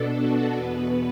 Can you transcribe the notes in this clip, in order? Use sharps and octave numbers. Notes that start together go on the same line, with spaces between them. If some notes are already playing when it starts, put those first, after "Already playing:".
Already playing: B2 B3 D4 A4
F#4
E2 B2 B3 B4